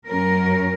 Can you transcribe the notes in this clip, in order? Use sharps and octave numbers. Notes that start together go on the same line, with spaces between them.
F#2 F#3 C#4 A#4